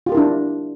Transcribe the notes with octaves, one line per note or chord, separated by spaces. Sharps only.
D4 E4 F4 G4 A#4